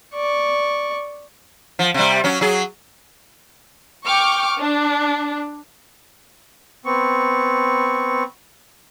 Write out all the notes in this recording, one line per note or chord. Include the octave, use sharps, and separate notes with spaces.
D5 C#6
F3
C3 G3
F#3 C#4
F#3 G#4
G5 C#6 D6 F6
D4
B3 C4 C#6